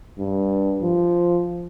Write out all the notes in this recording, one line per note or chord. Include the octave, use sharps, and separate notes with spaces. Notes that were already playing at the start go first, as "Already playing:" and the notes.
G2
F3